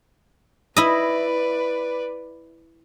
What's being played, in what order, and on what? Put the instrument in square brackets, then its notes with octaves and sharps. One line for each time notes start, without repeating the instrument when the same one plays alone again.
[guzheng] E4 D#5 [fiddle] B4 D5